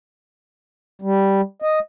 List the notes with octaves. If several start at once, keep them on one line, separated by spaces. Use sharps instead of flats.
G3
D#5